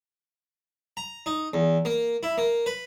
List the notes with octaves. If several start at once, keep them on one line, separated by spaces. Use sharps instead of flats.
A#5
D#4
E2
A#3
E4
A#3
B4